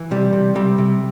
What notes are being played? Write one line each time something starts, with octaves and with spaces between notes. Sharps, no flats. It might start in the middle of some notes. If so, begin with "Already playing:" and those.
Already playing: E3
C3 G3
C3
C3 G3
C3